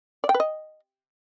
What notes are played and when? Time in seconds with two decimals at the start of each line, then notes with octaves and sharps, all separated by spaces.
0.24 D5
0.29 G5
0.34 B4
0.40 D#5